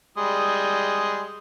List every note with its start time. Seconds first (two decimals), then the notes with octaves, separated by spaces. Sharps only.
0.18 G3 G#3 D#6